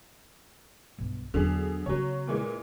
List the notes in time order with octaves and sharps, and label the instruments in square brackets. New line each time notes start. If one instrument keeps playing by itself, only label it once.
[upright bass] B1 G2
[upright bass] E2 F#3 [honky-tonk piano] D3 G#4
[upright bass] C#3 B3 [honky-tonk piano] F#3 C#5
[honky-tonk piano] A#2 E3 G#3